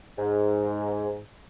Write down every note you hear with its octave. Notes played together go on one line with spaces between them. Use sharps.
G#2